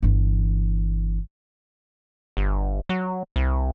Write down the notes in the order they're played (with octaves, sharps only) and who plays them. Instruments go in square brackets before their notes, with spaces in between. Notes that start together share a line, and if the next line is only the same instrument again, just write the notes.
[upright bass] G1 E3
[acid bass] G1
F#3
C2